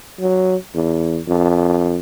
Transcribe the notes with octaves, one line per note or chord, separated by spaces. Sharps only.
F#3
E2
F2